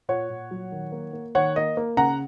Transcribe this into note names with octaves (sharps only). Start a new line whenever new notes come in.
A#2 C#5 F#5
A#2
F#3
D#3
A#3
A#3
D#3 C#5 F#5
A#3 D#5
A#3
C#3 F#5 A#5